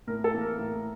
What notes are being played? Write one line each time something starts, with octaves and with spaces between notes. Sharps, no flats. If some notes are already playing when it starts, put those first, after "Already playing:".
A2 A#4
A4
E3 A#3
A#4
A2